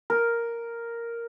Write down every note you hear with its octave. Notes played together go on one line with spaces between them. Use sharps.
A#4